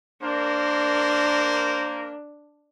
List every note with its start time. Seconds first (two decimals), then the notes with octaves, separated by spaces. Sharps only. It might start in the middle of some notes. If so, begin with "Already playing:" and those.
0.22 A#3 D4 A#4 C5